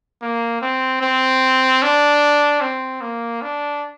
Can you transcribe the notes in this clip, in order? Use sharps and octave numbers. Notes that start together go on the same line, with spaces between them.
A#3
C4
C4
D4
C4
A#3
D4